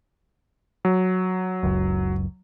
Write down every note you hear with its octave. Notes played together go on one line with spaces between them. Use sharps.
F#3
F#1 C#2 F#2